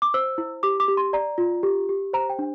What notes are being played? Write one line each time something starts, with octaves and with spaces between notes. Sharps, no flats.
D6
C5 E6
E4
G4 D6
D6
G4
C6
D5 A#5
F4
G4
G4
C5 A#5
G5
D4